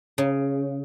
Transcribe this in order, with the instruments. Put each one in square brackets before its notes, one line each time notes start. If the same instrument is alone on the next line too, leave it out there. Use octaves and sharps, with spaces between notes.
[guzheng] C#3